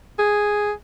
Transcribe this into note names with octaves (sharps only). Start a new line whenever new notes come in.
G#4